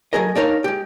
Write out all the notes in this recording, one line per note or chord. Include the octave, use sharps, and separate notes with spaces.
F#3 G#3 A3 G#4 A#4 D#5
D4 D#4 A#4 C#5 F5
G#3 G4